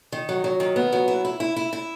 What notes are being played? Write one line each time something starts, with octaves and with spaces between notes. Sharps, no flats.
D#3
F#3
F#3
D#3
B3
F#3
E4
E4
E4
E4
E4